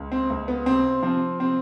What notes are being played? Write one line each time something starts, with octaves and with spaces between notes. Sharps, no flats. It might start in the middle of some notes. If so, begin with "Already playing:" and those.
Already playing: C#2
C4
C#2
B3
C3 C4
F3 C4
C3 C4